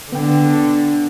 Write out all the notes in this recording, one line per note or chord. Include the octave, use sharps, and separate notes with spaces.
D3 B3 G5